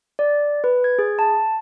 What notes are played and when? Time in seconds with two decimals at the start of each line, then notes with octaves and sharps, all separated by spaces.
0.19 D5
0.64 B4
0.84 G#6
0.99 G#4
1.19 A5